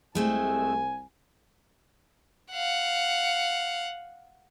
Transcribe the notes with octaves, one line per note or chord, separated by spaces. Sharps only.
C2 G#3 A3 C4 G#5
F5 F#5